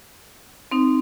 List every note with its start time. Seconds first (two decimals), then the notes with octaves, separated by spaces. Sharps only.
0.71 C4 D#4